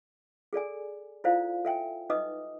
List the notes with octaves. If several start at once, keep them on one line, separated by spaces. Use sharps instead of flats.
G#4 A4 D5 G#5
E4 F4 A4 C5 D5 F5
A4 E5 G5 G#5
D#4 B4 D#5 D6 D#6